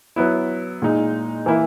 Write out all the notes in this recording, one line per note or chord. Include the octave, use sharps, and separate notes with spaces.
F#3 B3 E4
A#2 G#3 D#4
E3 A#3 E4